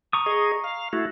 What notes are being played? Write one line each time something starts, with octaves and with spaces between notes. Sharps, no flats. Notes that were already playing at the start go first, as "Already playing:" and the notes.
A#5 C#6 D#6
G#4 D#5
F5
A3 E4 F#4